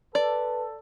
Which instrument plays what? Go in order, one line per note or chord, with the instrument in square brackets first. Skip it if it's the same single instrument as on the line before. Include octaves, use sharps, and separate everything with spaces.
[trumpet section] A4 [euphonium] B4 [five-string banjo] D5